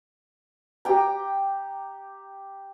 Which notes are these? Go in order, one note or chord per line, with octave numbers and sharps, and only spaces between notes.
G4 G5 A#5